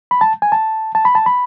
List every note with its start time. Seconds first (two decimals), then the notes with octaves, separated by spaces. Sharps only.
0.11 B5
0.21 A5
0.42 G#5
0.52 A5
0.95 A5
1.05 B5
1.15 A5
1.26 B5